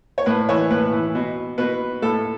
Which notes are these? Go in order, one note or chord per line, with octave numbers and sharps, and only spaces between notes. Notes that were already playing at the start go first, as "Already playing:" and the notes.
C#5
A2 B4
E3 C#5
A2 B4
E3
B2
B2 B4
A2 A4